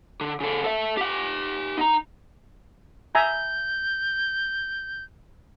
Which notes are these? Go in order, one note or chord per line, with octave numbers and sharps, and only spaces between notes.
D3
C#3 A4
A4 E5
G4 F#5
D#4 A#5
E5 G#5 A#5 G6